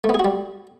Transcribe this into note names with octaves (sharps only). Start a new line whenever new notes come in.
A3
B3
G#4
F#4
G3